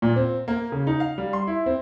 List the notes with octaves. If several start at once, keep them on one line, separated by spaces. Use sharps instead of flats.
A#2
C4
A#3
C#3
D#4
F5
G3
C6
E4
C4